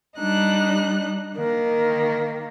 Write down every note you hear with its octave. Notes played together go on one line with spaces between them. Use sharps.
G3 D4 D#4 F#6
D#3 A#3